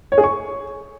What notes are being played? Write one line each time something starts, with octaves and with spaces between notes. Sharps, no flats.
C#5
G#4
C#6